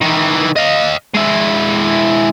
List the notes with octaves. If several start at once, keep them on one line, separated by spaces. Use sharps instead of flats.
D#3 E3
D#5 F5
G#3 E4